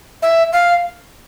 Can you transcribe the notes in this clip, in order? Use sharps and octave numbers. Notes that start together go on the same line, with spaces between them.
E5
F5